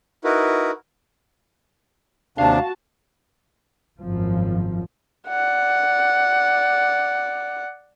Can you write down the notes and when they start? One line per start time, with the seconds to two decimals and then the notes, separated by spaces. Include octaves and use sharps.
0.24 D#4 E4 F#4 A#4 B4
2.38 D#2 C3 D4 F#4 F5 A5
4.01 G#1 F#2 F3
5.28 D5 F#5